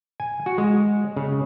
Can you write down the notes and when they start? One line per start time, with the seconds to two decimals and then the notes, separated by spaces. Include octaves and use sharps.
0.20 G#5
0.46 F#4
0.58 G#3
1.16 C#3